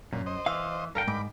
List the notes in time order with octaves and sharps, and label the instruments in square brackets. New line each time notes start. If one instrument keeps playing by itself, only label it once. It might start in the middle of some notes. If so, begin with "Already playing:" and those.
[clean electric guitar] F#2 [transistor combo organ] A#2
[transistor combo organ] C5 D#5
[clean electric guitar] E3 [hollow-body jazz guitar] F5
[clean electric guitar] G2 A#4 G5 [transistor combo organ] A4 F5 A#5
[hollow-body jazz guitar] G#2 [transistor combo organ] B5 D6